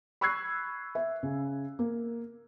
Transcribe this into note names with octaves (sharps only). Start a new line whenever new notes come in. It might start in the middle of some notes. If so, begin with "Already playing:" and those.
B5 C#6 E6 F#6 G#6 C7
E5
C#3
A#3